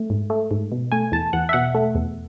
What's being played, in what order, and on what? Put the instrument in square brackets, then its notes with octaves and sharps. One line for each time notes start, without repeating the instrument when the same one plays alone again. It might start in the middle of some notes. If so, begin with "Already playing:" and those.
Already playing: [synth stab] A3
G#2
A3
G#2
B2
A3 G#5
E2 A5
E2 F#5
E5
B2 F#5
A3
E2